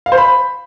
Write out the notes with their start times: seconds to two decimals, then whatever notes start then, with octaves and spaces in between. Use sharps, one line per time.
0.06 F5
0.12 C5
0.18 B5